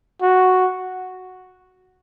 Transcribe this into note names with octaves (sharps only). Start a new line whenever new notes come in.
F#4